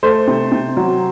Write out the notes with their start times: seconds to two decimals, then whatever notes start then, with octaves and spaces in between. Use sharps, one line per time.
0.03 A3 C5
0.28 C3
0.52 C3
0.77 F#3